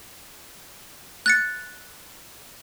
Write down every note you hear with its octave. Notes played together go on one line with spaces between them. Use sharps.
F#6 A6 C#7